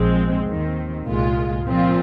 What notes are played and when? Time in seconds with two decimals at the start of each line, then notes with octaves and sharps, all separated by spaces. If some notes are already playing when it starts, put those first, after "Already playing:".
Already playing: A#1 G#2 F3 G#3 C4
0.47 D#2 D#3 C4
1.05 C2 A#2 G#3 F4
1.64 A#2 F3 C4 F4